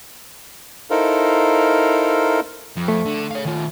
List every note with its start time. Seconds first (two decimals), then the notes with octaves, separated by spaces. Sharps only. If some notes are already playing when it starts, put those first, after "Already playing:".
0.91 D#4 E4 A4 A#4 C5 F5
2.76 F2
2.88 A3
3.05 D3
3.31 C#5 F5
3.45 D#3 F4